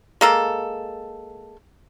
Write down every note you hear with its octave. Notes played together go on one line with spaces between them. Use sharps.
G#3 A#3 A4